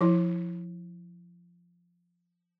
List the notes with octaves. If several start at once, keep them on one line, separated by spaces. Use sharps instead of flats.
F3 E4